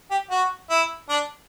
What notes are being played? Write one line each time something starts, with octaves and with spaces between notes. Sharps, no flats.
G4
F#4
E4
D4